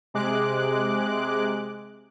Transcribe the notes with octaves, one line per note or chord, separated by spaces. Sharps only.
C3 G#3 D6 F#6